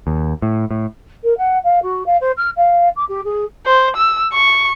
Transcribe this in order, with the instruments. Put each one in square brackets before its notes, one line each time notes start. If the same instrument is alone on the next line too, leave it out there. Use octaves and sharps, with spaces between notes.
[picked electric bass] D#2
A2
A2
[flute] A#4
F#5
F5
F#4
F5
C5
F6
F5
D6
G4
G#4
[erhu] C5
E6
C#6